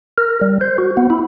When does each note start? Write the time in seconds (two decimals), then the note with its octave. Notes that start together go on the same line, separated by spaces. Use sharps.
0.18 A#4
0.41 G3
0.61 C5
0.78 F#4
0.97 B3
1.10 E4